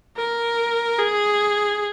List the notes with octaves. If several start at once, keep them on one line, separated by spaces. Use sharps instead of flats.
A#4
G#4